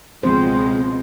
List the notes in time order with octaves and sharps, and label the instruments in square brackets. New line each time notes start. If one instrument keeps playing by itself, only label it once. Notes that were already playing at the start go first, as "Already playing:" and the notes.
[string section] C#2 B2 G#3 [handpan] F3 C4 C5